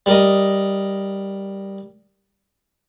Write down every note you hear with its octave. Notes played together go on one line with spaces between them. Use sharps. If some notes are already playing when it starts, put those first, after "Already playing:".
G3 A#4 D#5